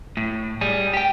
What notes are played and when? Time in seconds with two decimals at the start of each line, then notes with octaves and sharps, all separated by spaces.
0.17 A2
0.61 G3 G#4
0.93 G4 G5